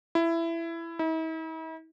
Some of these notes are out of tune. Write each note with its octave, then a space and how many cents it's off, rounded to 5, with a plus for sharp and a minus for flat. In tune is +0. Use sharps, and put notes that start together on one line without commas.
E4 +15
E4 -45